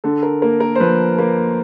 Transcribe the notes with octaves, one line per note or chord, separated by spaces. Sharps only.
D3 A4
A#4
A#3 A#4
A#4
C5
F3 B4
A#3 B4